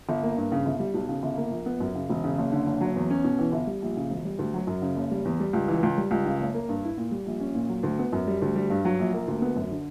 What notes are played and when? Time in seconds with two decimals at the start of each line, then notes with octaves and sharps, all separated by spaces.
0.09 G1
0.23 A#3
0.37 G2
0.52 C#3
0.66 G1
0.79 G3
0.94 B1
1.08 C#3
1.23 G1
1.37 A#3
1.51 A#1
1.66 B3
1.80 F#2
1.95 C#3
2.09 E1
2.24 C#3
2.38 F#1
2.52 D3
2.67 F#1
2.81 F#3
2.96 E2
3.10 C#4
3.24 B2
3.39 E3
3.52 G1
3.67 G3
3.82 A#1
3.96 C#3
4.10 E1
4.25 G3
4.39 D2
4.54 F#3
4.67 F#2
4.82 C#3
4.96 F#1
5.11 G3
5.25 E2
5.40 G3
5.53 C#2
5.68 E3
5.83 C#2
5.97 G3
6.11 C#2
6.25 C#3
6.40 F#1
6.54 A#3
6.69 G2
6.83 E4
6.98 A#2
7.11 G3
7.26 A#1
7.40 C#4
7.55 A#2
7.69 F#3
7.83 D2
7.99 B3
8.13 F#2
8.27 G3
8.42 D2
8.56 G3
8.70 G2
8.85 F#3
8.99 A#1
9.13 A#3
9.27 D2
9.42 B3
9.56 F#2
9.71 D3